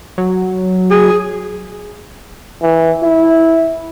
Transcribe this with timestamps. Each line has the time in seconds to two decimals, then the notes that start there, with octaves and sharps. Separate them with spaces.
0.18 F#3
0.91 G#4
2.62 E3
3.03 E4